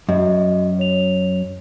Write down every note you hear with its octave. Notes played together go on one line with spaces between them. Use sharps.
F#2 F#4 D#5
C#5 F7